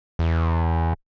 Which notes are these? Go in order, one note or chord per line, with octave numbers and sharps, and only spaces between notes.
E2